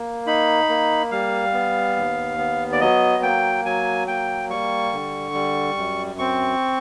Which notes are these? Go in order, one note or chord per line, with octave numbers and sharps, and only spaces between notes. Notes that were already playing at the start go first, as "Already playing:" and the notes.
Already playing: A#3
D#4 B5
A#3
G3 F5
B3
D#2
B3
D5
F#3 D#5
A#3 G5
F#3 G#5
A#3 G5
G3 C#6
D3
G3
F#2
C4 C#6